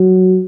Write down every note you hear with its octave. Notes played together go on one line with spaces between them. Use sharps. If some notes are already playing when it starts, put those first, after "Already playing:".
Already playing: F#3